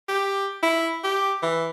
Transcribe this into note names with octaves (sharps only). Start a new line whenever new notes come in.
G4
E4
G4
E3